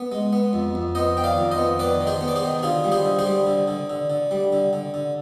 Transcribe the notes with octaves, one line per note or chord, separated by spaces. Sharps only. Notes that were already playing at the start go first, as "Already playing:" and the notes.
Already playing: B3
G#3
B3
F2
F2
B3 C5 D#5
D#3 G5
D5 F5
F2
C5 D#5
B3
D#3 B4 D5
D#3
G#4 C5
B3
D5
G#4 C5
D#3
D3 F4 G#4
G3
G#4 C5
D3
G#4 C5
G3
D3
D3
D3
D3
G3
D3
D3
D3